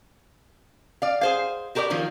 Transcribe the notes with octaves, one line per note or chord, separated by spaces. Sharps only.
D5 F5
G#4 C5 F5
F#4 G4 A#4 B4 D5
D#3 F3 F#3 A#3